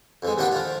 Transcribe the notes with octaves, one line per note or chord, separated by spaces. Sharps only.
F2 E3 G#3
D#2 D#3 D4 F#5 G5 B5
F3 F4